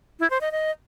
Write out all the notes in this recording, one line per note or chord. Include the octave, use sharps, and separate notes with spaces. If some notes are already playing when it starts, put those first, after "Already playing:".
E4
C5
D#5
D#5